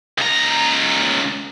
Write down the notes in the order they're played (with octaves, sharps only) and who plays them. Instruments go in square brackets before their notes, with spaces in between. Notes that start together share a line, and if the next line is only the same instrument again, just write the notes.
[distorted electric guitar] C#2 A#5